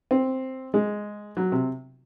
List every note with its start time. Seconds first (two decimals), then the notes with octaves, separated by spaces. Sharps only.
0.11 C4
0.74 G#3
1.37 F#3
1.52 C3